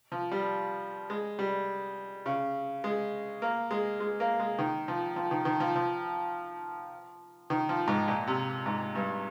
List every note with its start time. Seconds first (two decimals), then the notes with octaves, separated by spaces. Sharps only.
0.12 F3
0.31 G3
1.10 G#3
1.39 G3
2.26 C#3
2.84 G#3
3.42 A#3
3.71 G#3
4.00 G#3
4.20 A#3
4.39 G#3
4.59 D#3
4.88 F3
5.16 F3
5.31 D#3
5.45 D#3
5.60 F3
5.75 F3
7.50 D#3
7.69 F3
7.88 G#2
8.08 A#2
8.27 C3
8.66 G#2
8.95 G2